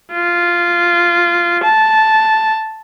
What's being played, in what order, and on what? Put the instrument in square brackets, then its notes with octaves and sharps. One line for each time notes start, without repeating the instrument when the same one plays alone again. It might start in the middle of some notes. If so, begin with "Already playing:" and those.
[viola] F4
A5